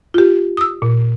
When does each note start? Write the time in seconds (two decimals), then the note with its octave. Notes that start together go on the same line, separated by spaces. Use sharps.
0.14 F4 G4
0.57 D#6 E6
0.82 A#2